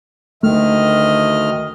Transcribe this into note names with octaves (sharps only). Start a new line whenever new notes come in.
D2 D#3 A3 D#5 F6